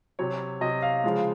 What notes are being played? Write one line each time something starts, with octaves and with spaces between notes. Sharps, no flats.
C3 F#3 C#5
C3 F#3 D#5
F5
C#3 F3 G#3